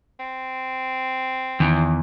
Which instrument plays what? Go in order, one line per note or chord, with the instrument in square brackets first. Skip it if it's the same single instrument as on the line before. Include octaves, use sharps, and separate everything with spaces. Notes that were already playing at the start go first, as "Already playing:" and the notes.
[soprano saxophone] C4
[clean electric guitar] E2 [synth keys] D#3